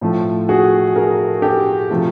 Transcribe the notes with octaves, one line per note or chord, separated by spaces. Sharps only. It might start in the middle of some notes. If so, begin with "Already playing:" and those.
A2 F3 A3
F#4 G#4
G#4 A#4
G4 A4
C3 F3 A3